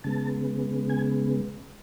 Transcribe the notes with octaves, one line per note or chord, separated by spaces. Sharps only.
C#3 G#3 B3 A5
G#5